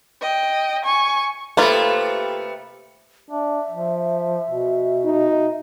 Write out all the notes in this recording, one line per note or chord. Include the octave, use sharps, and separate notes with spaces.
D#5 G5
G#5 C#6
C3 A3 A#3 F4 B4
D4 E5
F3
B2
D#4